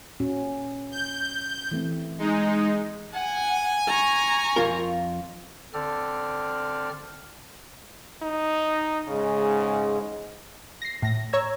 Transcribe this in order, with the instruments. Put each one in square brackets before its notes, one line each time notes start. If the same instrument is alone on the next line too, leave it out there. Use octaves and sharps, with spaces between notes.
[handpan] A#2 C#4 F#4
[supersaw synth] G6
[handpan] E3 A3 C4
[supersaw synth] G#3 D#4
[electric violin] F#5 [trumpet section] G#5
[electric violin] A#5 C#6
[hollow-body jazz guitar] F2 F4 A#4
[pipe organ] D3 C4 A4 D5 F6
[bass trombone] D#4
[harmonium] G#2 G#3 [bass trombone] C#3
[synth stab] A#6 C7
A2 A#6
C#5 A#5 E6 G#6